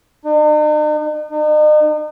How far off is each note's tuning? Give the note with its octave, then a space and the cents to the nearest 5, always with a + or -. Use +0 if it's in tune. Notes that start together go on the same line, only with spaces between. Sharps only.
D#4 -45
D#4 -40